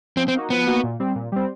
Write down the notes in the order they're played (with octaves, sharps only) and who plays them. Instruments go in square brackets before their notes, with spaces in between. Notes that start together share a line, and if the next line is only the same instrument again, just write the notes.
[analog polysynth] F3 [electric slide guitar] C4
[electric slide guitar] C4
[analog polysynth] A#3 D#4 F#4
[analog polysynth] F3 [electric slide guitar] B3
[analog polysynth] A#3 D#4 F#4
A#2
G3 C4
A#2
G3 C4